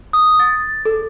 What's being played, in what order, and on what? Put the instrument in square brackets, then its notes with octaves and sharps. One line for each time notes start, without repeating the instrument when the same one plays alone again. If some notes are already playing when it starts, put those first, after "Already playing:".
[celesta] D#6
A6
A4